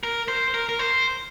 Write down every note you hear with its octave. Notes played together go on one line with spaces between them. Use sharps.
A#4
C5
A#4
A#4
C5